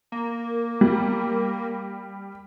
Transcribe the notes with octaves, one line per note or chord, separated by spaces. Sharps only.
A#3
G3